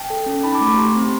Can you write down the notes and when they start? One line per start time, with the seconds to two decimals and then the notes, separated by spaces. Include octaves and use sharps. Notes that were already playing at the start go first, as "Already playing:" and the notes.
Already playing: G5 A5
0.10 A4
0.26 C#4
0.43 D#4 A5 B5
0.55 D6
0.61 A3
0.67 C#6
0.78 G4 A#5 C6
0.96 C4